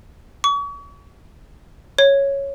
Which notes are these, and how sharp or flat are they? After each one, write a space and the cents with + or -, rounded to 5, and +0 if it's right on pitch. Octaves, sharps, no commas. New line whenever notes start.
C#6 +40
C#5 -5